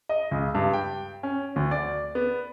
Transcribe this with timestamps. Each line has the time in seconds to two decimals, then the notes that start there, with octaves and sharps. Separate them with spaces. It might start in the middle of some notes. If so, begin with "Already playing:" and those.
0.09 D#5
0.31 C#2
0.55 G2
0.73 G5
1.23 C#4
1.56 D2
1.71 D5
2.15 B3